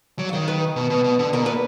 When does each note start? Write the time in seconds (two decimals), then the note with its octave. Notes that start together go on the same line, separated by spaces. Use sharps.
0.19 F#3 D5
0.29 D#3 D#5 F5
0.48 B4
0.76 B2
0.90 B2
1.04 B2
1.19 D3
1.33 B2 A#4
1.43 A#2 B4